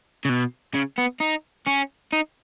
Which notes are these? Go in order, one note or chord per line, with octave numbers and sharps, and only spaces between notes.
C#3
B2
C#3
B3
D#4
C#4
D#4